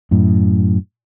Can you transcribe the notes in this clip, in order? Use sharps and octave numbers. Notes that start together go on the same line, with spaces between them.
F#2 A2